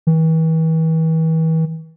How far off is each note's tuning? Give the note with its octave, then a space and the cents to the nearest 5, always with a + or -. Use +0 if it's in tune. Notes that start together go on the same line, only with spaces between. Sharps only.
E3 -40